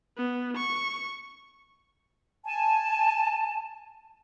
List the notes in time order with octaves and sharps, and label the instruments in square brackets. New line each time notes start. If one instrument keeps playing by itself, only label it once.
[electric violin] B3
C#6
[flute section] G#5 A5